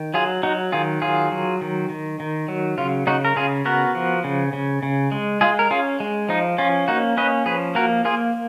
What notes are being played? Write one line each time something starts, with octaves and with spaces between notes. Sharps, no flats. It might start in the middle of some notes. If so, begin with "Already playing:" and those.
Already playing: D#3
F#3 F4 G#4
F#3 D#4 F#4
D#3 F4 G#4
F#3 F4 G#4
F#3
D#3
D#3
D#3
F#3
C#3 F4
C#3 D#4 F#4
A#4
C#3 F4 G#4
B3 F#4 A#4
F3
C#3
C#3
C#3
G#3
G#3 F4 G#4
A#4
C#4 F4 G#4
G#3
F3 D#4
C#4 F4
A#3 D#4 F#4
C#4 B4 D#5
F3 G#4 B4
A#3 F#4 A#4
A#3 F4 G#4